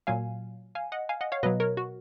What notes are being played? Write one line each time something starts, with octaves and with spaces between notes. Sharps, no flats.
A#2 F#3 F5 G#5
F5 G#5
D#5 F#5
F5 G#5
D#5 F#5
C#5 F5
B2 F#3 B4 D#5
A#4 C#5
F#4